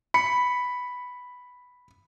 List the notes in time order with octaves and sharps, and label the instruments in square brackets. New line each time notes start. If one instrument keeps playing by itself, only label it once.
[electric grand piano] B5 C#7